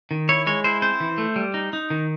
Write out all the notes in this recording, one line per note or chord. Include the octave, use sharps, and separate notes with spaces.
D#3
E4 C#5
G#3 C#5
E4 C5
C4 C5
E3
A3
G3
D#4
D#4
D#3